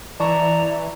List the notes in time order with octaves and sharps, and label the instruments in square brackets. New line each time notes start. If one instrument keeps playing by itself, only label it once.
[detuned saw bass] E3 [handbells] D5 A5 C#6 [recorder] A#5